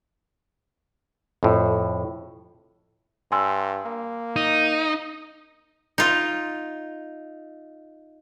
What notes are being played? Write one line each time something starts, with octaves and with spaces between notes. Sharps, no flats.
F2 A2
G2 G#5 C6 E6
A#3
D#4
D#4 F4